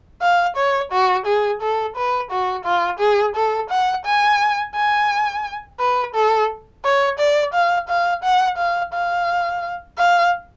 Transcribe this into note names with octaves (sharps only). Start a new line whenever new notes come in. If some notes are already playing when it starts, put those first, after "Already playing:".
F5
C#5
F#4
G#4
A4
B4
F#4
F4
G#4
A4
F#5
G#5
G#5
B4
A4
C#5
D5
F5
F5
F#5
F5
F5
F5